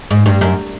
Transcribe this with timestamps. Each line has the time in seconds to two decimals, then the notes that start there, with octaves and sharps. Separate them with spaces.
0.11 G#2
0.26 G2
0.41 F#2